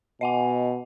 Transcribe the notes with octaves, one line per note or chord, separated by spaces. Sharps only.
B2 D#5 F#5 G#5